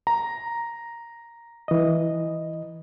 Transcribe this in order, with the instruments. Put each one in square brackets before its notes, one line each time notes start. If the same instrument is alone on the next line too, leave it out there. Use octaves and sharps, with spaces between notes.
[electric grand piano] A#5
[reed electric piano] E3 D#5